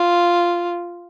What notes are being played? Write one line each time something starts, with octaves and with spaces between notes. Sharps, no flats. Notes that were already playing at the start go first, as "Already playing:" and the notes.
Already playing: F4